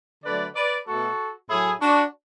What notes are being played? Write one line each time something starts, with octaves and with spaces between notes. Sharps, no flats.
D3 F#3 A3 B4 D5
B4 D5
B2 A3 F#4 A4
A2 F#3 A3 E4 G#4
D4 F#4